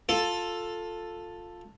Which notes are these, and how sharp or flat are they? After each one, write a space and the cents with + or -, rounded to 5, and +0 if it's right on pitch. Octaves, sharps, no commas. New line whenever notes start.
F4 +15 A4 +5